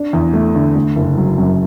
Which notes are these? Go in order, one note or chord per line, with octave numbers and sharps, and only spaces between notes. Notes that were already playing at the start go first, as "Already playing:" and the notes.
Already playing: D4
E2
A3
D3
A3
F#1
F#3
F#2